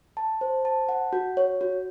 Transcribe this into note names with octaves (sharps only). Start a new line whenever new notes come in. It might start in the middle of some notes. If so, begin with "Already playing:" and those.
A5
C5
A5
F#5
F#4
C#5
F#4